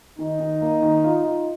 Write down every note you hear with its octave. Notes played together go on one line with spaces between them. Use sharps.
D#3 D#4
D#3
A#3
D#3
F4
F4